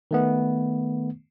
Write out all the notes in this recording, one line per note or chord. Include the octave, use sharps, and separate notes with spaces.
D#3 A3 B3